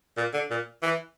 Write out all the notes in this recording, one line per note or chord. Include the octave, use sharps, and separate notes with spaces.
A#2
D3
A#2
E3